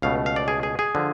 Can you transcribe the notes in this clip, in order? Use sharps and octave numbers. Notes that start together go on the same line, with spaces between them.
C#2 B2 A3 F5
F5
D5
G#4
G#4
G#4
D3 F3